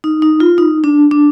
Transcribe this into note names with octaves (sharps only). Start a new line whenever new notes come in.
D#4
D#4
F4
D#4
D4
D4